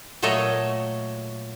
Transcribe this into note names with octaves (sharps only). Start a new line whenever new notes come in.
A#2 F#3 A3 A4 C#5 D#5